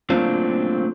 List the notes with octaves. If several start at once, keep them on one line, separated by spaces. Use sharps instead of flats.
F#3 A3 A#3 C4 D4 F4